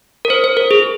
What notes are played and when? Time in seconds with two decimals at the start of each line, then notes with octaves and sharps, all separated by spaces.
0.25 A#4
0.30 C5
0.44 C5
0.57 A#4
0.71 G#4